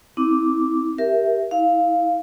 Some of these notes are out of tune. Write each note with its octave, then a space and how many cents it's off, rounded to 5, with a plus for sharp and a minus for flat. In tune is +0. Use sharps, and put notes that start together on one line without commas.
C4 +0 E4 -35 D6 -5
G4 +0 A#4 +0 E5 +0
E4 -35 F5 +0